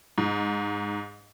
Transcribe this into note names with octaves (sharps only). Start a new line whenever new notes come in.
G#2